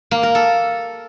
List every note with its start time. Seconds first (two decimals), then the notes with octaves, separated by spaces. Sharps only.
0.11 A#3
0.23 A#4
0.35 A4